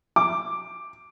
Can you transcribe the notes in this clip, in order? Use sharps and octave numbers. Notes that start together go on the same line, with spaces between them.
D6